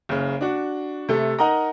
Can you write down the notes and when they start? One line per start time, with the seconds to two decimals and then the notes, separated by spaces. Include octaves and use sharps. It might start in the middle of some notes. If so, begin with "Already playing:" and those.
0.09 F#1 C#3
0.41 D4 F#4
1.09 C3 A3 A4
1.38 D#4 A#4 D#5 F#5 A#5